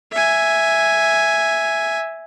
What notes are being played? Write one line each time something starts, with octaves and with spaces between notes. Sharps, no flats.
E5 G#5